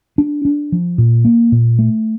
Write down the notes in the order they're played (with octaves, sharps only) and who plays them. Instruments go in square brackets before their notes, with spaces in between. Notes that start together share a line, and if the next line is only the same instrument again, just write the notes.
[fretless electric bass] D4
D4
F3
A#2
A#3
A#2
A3